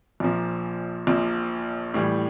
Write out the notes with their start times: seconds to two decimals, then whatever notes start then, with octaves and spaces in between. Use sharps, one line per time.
0.20 A#1 A#2 F3
1.07 A#1 A#2 F3
1.94 A2 E3 G3